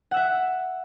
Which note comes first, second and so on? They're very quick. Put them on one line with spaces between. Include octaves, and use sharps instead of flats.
F#5 E6 E5